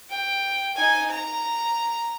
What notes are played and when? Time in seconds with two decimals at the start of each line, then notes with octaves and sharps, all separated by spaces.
0.10 G5
0.76 D#4 G#5
1.11 A#5